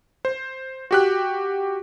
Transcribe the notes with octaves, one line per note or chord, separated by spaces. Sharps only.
C5
F#4 G4 F#6